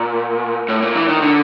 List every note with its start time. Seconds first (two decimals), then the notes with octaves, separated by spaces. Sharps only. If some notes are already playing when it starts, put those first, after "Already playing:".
Already playing: A#2
0.69 A2
0.82 A#2
0.95 E3
1.09 D#3
1.22 D3